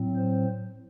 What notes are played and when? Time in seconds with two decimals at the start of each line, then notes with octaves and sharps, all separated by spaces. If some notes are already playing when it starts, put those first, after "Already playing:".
Already playing: A2 F#3 C4
0.16 C5